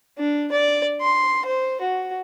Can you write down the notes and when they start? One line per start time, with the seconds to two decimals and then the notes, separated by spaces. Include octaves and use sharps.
0.18 D4
0.52 D5
1.02 C6
1.45 C5
1.81 F#4